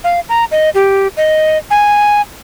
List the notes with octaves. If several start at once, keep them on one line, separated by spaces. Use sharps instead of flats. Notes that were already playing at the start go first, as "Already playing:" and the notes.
F5
A#5
D#5
G4
D#5
G#5